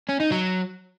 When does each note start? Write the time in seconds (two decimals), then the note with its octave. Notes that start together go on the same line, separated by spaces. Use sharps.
0.09 C#4
0.20 D#4
0.32 F#3